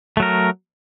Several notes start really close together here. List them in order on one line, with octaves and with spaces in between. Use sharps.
A3 F#3 A#4